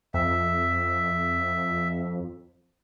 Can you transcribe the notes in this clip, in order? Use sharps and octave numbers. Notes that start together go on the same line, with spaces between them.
F2 E5